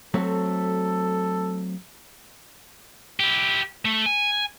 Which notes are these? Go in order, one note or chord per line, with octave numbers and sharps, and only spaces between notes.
F#3 A3 C4 A4
E4 G4
A3
G#5